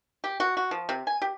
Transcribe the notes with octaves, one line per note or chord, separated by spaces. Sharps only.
G4
F#4
F#4
F3
C3
G#5
G4